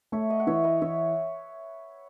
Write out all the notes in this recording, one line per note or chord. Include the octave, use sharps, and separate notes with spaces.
A3 C#5 E5
D#5 F#5
F#5
E3 C#5 E5
B4 D#5
E3 C#5 E5